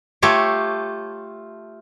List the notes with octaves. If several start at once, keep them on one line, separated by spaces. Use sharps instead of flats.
A3 F4 G4 C#5